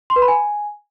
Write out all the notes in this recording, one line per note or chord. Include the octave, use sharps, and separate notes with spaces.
C6
B4
B5
G#5